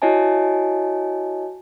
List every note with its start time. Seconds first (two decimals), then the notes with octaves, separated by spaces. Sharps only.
0.02 E4 F#4 C#5 D#5 G#5 A5